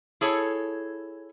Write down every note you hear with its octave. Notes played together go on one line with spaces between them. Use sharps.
E4 G#4 A4 C#5